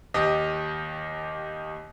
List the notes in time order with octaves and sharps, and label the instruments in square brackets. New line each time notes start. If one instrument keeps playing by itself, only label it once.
[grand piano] D#2 G4 D#5